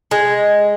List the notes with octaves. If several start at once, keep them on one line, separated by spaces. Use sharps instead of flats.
G#3